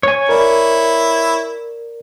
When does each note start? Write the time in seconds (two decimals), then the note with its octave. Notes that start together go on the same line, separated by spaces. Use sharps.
0.03 C#5 G#5
0.29 E4 A#4 D5